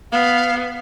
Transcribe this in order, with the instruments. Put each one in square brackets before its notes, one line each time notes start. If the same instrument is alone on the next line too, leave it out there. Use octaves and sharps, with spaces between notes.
[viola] B3 [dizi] F5